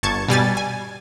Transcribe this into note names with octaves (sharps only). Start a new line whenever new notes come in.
G1 A5 C#6 G#6
B2 G3 G#5 A6
G#5